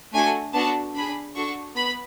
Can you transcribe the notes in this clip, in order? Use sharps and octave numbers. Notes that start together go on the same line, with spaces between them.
A3 D4 F#4 A4 G#5
B3 D4 F#4 A4 A5
D4 G#4 B5
D4 F#4 A4 C#6
B3 B5